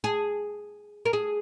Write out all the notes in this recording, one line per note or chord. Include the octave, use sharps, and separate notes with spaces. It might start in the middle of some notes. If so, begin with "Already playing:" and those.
G#4
A#4
G#4